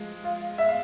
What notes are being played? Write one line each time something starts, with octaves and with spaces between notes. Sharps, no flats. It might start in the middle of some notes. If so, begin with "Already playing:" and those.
Already playing: F3 G#3
F4
E5
F5